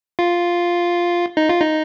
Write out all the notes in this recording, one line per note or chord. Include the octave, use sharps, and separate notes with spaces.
F4
D#4
F4
D#4